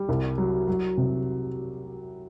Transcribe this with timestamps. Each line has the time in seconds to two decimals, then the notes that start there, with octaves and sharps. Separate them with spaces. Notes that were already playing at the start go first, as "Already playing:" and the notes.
Already playing: G3
0.09 C2
0.38 F#3
0.68 F#3
0.97 C3